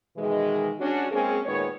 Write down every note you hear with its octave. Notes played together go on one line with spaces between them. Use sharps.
B2 D#3 E3 G#3
C#4 D4 F#4
G#3 A#3 C4 C#4 G#4
A#2 D#3 G#3 B3 C#5